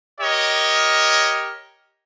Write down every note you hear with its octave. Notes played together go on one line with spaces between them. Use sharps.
G4 A#4 C#5 D#5